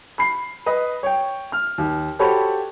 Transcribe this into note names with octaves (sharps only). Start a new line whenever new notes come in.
B5 C7
B4 D#5
C#5 G5
F6
D#2
F#4 G4 A4 C5 C#5 B5